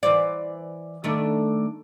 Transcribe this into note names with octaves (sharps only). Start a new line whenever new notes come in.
E3 C5 D5
D#3 A3 D4